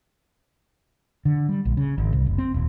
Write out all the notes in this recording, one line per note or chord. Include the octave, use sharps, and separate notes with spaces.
D3
G3
A#1
C#3
G#1
C2
F#1
C4
D#1